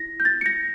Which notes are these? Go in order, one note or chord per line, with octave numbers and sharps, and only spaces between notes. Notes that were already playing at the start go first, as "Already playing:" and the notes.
Already playing: E4 A#6
G6
A6
C#7
A#6